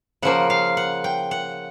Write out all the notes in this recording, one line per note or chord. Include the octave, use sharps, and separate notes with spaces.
C#3 F3 A#3 F#5
F5
F#5
G5
F#5